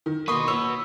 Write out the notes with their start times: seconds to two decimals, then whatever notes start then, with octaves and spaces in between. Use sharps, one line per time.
0.06 D#3
0.28 A#3 F#4 B4 D#5 C6 C#6
0.48 C#5 E6